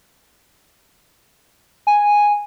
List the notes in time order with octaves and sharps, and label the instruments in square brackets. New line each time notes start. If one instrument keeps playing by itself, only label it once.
[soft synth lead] G#5